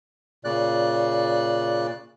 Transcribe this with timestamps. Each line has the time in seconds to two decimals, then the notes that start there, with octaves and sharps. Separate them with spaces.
0.44 A#2 C#3 D5 F#6